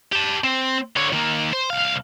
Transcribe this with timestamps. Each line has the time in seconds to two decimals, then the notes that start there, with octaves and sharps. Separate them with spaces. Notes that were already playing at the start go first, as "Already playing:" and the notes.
0.12 G4 A5
0.44 C4
0.96 D3 C#5
1.13 D#3 A#3
1.53 C5
1.70 C2 F5